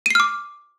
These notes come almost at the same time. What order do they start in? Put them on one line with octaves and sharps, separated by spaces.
D#7 C7 F6 D6